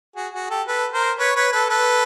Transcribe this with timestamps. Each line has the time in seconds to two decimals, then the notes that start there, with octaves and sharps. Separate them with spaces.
0.16 F#4 G#4
0.34 F#4 G#4
0.50 G4 A4
0.68 A4 B4
0.93 A#4 C5
1.19 B4 C#5
1.36 B4 C#5
1.52 A4 B4
1.69 A4 B4